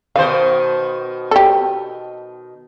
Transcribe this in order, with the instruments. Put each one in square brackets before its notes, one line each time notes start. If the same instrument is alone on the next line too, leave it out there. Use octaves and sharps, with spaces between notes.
[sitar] B2 D#3 C5 [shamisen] F5
[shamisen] G4 A4